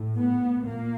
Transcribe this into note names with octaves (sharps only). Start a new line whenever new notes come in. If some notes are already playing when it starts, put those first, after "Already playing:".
Already playing: A2
B3
A#2 A#3